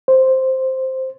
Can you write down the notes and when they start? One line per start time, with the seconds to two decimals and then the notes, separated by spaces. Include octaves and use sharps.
0.08 C5